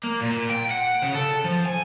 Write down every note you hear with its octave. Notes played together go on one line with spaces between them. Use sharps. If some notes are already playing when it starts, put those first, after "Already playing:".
A#3
A#2
G5
F#5
C#3
A4
F3
G#5